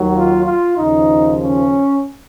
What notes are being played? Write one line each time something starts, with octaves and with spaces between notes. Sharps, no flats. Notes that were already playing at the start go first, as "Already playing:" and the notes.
Already playing: D#2 D#3 F#3
F4
F4
D#2 C#3 F3 D#4
C#4